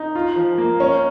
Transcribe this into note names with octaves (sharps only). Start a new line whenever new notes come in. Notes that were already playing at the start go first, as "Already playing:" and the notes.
Already playing: D#4
F4
F3
A#3
C#4